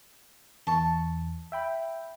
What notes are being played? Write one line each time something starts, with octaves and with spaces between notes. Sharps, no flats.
E2 A5 C#6
E5 G5 B5